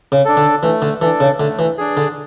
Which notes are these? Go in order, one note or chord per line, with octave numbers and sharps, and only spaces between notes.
C#3
D4 A4
D3
E3 A3
D3
E3 D4 A4
C#3
D3 A3
E3
D4 G#4
D3